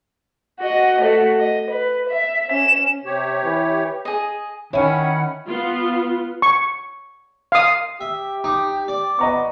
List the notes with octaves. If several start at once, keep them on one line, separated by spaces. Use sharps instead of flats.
F#4 D#5
A3 F#4
D#5
B4
E5
C#4 E7
C3 G4 C#5
E3
G#4 D#5
D#3 C#4 E4 C#5 F#5 G#5 B5
B3 F4
C#6
F5 D#6
G4 E5
D#4 D6
D5
B3 D#5 A#5 C#6